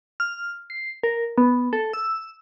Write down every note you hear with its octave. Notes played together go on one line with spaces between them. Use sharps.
F6
C7
A#4
B3
A4
E6